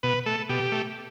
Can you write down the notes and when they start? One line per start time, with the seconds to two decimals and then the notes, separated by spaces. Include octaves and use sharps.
0.03 B2 B4
0.26 A3 A4
0.49 B2 G4
0.72 A3